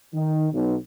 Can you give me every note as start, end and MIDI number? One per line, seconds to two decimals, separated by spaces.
0.14 0.48 51
0.53 0.76 35